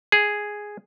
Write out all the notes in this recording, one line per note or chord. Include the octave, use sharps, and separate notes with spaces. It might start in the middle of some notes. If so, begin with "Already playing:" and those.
G#4